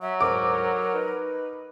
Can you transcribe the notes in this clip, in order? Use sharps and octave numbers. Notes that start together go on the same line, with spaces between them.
F#3 E5
D2 G#2 A#4 D6
D#4 B4